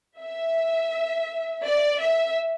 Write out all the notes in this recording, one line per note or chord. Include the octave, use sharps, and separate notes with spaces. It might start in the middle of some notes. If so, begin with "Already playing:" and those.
E5
D5
E5